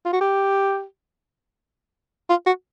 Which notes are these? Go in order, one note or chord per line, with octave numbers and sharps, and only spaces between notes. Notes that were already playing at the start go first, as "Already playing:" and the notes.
F4
F#4
G4
F4
F#4